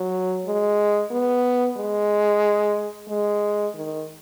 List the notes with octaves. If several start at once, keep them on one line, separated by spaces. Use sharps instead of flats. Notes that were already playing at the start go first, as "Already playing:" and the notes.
Already playing: F#3
G#3
B3
G#3
G#3
D#3